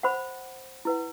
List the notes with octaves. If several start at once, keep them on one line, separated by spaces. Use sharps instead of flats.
C5 F#5 B5
E4 B4 F#5